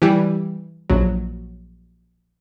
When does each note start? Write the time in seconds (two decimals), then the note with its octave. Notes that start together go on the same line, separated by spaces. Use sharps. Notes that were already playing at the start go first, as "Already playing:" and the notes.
0.02 E3 G3
0.90 A#1 F#3